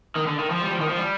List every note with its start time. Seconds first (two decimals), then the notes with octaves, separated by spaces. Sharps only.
0.16 D#3
0.27 D3
0.39 D#3
0.50 F3
0.62 G3
0.71 F3
0.79 D#3
0.88 F3
0.97 G3